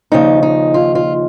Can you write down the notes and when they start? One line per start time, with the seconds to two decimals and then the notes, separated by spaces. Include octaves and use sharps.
0.12 D#2 C#3 F3 D#4
0.43 D#4
0.74 F4
0.95 F4